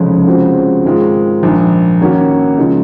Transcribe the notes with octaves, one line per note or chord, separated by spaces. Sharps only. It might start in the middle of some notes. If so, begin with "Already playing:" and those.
Already playing: F1 F2 C#3 G#3 C#4
C#3 F3 G#3 C4 F#4
G#2 D#3 G#3 C4 F4
A#1 G#2 D#3
D#2 D#3 A#3 C#4 F#4
C#3 F3 G#3 D#4